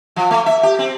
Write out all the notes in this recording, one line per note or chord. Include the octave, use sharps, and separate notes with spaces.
F3
A3
E5
G4
C4